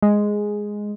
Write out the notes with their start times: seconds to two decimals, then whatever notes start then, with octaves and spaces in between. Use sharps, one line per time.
0.02 G#3